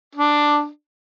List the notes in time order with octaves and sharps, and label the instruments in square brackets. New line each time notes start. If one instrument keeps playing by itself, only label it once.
[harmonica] D4